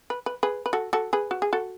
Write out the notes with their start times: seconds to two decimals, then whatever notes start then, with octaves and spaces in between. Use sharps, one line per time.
0.10 B4
0.26 B4
0.43 G#4 B4
0.66 B4
0.73 F#4 A4
0.93 F#4 A4
1.13 G#4 B4
1.31 F#4
1.42 G#4
1.53 F#4 A4